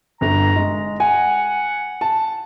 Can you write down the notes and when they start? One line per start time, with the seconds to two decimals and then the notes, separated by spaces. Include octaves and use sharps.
0.21 G1 A#5
0.56 G#3
1.00 F#5 G#5
2.01 A5